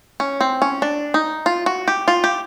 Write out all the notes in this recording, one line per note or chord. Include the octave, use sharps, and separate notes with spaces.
C#4
C4
C#4
D4
D#4
F4
F#4
G4
F4
G4